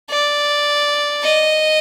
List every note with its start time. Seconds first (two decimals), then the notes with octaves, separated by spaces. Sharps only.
0.11 D5
1.23 D#5